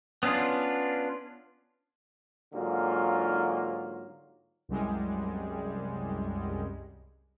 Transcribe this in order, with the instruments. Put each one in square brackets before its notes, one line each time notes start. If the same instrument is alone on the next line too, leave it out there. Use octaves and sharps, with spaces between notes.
[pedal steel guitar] B3 C#4 D4 F4
[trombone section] G#2 D3 F#3 A#3 F4
[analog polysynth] C2 F#2 G3 G#3